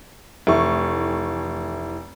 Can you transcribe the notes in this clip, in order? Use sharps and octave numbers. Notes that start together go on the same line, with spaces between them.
F1 E3 A3 C#6